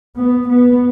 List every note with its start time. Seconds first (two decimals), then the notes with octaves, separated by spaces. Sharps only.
0.16 B3
0.49 B3